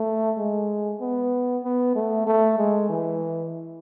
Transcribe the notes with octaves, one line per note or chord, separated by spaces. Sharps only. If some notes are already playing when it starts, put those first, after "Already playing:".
Already playing: A3
G#3
B3
B3
A3
A3
G#3
E3